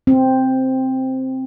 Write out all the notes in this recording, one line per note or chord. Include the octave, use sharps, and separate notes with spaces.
C4